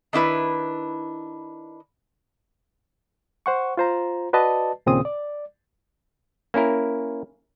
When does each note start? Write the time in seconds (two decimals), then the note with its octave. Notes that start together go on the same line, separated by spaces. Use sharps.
0.13 D#3 D4 E4 B4
3.46 C5 F#5 C#6
3.77 F4 C5 A#5
4.33 F#4 B4 D5 D#5 A5
4.86 D#2 A#2 C#3 C4 G#4 D#6
5.05 D5
6.54 A#3 C#4 E4 A#4